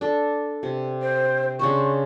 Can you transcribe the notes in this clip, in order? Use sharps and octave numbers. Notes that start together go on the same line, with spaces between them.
D4 A4
C3
C5
C#3 D4 C5 C#6